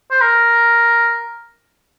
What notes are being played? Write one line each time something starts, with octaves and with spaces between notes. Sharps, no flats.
C5
A#4